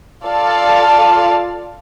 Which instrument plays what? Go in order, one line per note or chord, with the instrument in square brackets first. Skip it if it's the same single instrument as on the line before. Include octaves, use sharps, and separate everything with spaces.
[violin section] F4 A4 D5 F5 A5